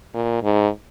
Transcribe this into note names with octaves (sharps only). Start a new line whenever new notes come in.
A#2
G#2